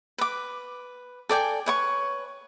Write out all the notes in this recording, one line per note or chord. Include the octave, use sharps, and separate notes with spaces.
B4 D6
A4 D5 G5 G#5
B4 C#5 C#6